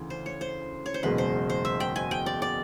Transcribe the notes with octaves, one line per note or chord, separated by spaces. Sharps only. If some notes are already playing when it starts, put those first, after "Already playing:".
Already playing: D2 C#3 E3
C5
C#5
C5
C#5
C5
F#1 E2 B2 G#3 B4
C5
C5
E5
G5
G#5
G5
D5
D5